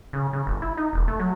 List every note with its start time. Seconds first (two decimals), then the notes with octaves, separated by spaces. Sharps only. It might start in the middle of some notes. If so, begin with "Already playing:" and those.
0.13 C#3
0.33 C#3
0.47 G1
0.62 E4
0.77 D#4
0.93 E1
1.08 A3
1.19 F#3